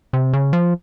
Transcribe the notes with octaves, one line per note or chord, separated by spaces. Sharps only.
C3
C#3
F3